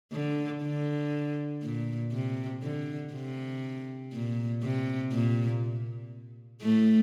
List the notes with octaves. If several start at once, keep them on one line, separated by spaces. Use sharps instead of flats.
D3
D3
A#2
C3
D3
C3
A#2
C3
A#2
A2 A3